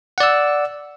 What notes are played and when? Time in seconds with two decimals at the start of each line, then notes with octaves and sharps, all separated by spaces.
0.18 F#5
0.20 D5
0.23 E6